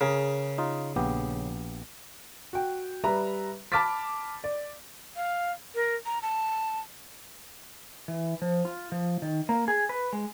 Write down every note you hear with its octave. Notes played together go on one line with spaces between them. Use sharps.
C#3 G#4 A#4
D#4 F4
A#1 B3 G4
F#4 G5
G3 B4 E5 A#5
A5 B5 D6 F6 A6 B6
D5
F5
A#4
A#5
A5
E3
F3
F4
F3
D#3
A#3
G#4
B4
G#3